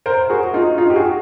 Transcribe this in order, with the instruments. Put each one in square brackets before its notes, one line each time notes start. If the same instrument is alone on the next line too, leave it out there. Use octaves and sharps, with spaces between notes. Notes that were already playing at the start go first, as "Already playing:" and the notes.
[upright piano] A#4 C5
F#4 G#4
D#4 F4
D#4 F4
G4
F#4 G#4